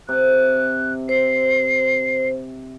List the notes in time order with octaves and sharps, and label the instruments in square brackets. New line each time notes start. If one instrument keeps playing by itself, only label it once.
[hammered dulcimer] C3 [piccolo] F#6
[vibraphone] C5 [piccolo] C7